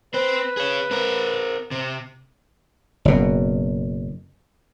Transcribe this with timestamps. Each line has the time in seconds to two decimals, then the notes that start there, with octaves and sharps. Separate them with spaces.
0.14 C4 B4 C5
0.57 G#4 C#5
0.91 C4 A#4
1.71 C3
3.05 F#1 B2